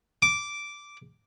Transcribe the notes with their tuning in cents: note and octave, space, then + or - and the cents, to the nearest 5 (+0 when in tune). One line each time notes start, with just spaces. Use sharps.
D6 -5